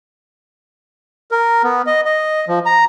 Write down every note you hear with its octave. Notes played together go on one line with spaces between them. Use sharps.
A#4
B3
D#5
D#5
F3
A#5